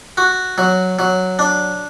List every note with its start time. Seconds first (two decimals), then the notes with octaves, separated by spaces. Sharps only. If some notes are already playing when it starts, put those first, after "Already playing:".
0.17 F#4
0.58 F#3
0.99 F#3
1.39 D4